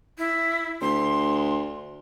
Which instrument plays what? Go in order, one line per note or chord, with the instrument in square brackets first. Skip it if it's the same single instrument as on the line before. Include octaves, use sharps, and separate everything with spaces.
[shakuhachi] E4
[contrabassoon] D2 [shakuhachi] C6